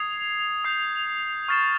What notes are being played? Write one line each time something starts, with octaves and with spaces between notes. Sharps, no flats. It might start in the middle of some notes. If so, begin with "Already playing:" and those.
Already playing: D#6 G#6 C7 F7
D#6 G6 C7
C#6 F6 A6 C7 E7